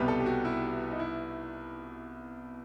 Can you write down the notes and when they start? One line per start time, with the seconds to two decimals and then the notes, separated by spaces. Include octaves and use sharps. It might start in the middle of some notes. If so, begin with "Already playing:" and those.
Already playing: C2 B2 G3 B4
0.08 A4
0.20 G4
0.26 F#4
0.45 E4
0.91 D#4
0.99 E4